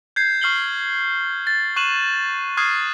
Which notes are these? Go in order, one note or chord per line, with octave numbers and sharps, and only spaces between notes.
G6 G#6 C7
C#6 F6 C7 F#7 G7
A6
C#6 F#6 D#7 E7 F#7
C#6 D#6 F6 F#6 G#6 C7